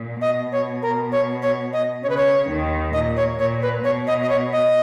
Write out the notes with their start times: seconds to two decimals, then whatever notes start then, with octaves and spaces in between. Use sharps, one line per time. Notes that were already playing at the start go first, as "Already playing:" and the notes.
Already playing: A#2
0.21 B2 D#5
0.52 C#5
0.82 A#4
1.12 C#5
1.42 C#5
1.73 D#5
2.03 C#3 C#5
2.10 B4
2.17 C#5
2.48 D#2 D#3
2.93 A#2 D#5
3.17 C#5
3.38 A#2 C#5
3.62 B4
3.84 B2 C#5
4.07 D#5
4.22 D#5
4.29 C#5
4.52 D#5